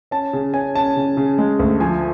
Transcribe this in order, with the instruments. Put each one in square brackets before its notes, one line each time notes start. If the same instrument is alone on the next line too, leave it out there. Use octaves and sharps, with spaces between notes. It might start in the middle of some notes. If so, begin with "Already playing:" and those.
[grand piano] C#4 A5
C#3
C#4 G#5
C#4 A5
C#3
C#3
G#3
D2
F3 G#5